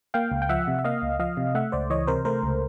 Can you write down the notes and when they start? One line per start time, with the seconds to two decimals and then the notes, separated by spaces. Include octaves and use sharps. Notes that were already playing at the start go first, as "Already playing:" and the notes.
0.14 A#3 F5 G5
0.32 C#2
0.42 G5
0.49 F3 E5 F#5
0.68 C3
0.79 E5
0.85 A#3 D#5 F5
1.02 C#2
1.19 F3 D#5 F5
1.37 C3
1.55 A3 E5 F#5
1.72 C#2 C5 D5
1.90 E3 C#5 D#5
2.07 C3 A#4 C5
2.25 A3 A#4 C5
2.43 C#2